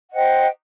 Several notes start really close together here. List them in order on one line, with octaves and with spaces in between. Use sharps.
F#5 D#5 C5 G5